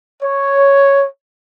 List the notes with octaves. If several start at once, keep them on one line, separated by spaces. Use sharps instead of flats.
C#5